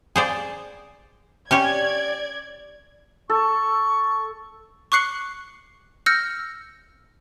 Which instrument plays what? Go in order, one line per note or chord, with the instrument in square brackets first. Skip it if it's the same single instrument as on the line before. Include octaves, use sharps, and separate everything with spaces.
[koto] G#4 C5 D5
[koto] C#4 G4 C#5 [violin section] D5 G#6
[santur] A4 [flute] C#6
[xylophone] C#6 D6 F#6 C7 C#7 F#7
E6 F6 G6 A#6 C#7